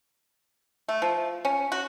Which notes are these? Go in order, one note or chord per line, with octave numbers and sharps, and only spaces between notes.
A3
F3
C#4
F#4